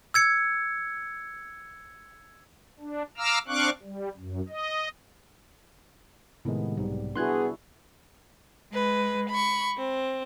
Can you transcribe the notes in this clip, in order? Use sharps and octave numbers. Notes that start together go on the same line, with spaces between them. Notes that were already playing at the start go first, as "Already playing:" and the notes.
E6 G#6 C#7
D4
F5 A#5 D6 E6 F6
C4 D4 F5 C#6 D6 F#6
G3
F#2
D#5
A2 C3 D#3 G#3 B3
B1 G#2 G3
B3 D4 E4 F#4 G#4 C6 F#6 G#6
G#3 B4
B5 C#6
C4